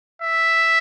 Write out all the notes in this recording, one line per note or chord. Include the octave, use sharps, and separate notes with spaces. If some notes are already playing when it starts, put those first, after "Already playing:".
E5